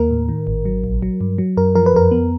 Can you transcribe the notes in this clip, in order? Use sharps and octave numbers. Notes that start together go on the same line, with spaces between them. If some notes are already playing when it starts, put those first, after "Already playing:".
Already playing: D#2 A#3 A#4
A2
D#3
G#1
F#3
A#1
F#3
G2
F#3
F#2 A#4
F3 A#4
B4
F2 A#4
B3